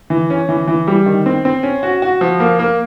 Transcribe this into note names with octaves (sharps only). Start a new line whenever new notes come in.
E3
C#4
E3
E3
G3
D#3
C4
C4
C#4
F#4
F#4
F3
A#3
A#3